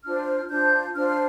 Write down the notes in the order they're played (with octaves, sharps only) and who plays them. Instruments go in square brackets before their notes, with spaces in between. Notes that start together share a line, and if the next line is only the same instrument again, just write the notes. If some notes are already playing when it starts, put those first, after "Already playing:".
[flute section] D4 F4 C5 F6
D4 F4 C5 G6
D4 F4 C5 F6
F6